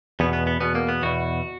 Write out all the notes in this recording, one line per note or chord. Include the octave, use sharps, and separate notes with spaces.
E2 B2 B3
B3
B3
E2 B2 B3
A#3
B3
E2 B2 F#4